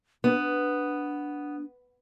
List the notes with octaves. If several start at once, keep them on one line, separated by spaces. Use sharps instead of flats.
B3 D4